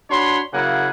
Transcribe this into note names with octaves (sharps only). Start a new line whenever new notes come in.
D4 F#4 C#5 B5 C6
C#3 F#3 A#3 E4 F#5 G#5